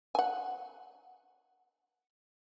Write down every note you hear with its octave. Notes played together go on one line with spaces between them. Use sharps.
F#5 G#5